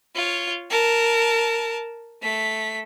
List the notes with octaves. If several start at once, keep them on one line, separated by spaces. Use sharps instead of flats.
F4 C#5
A#4 A5
A3 B6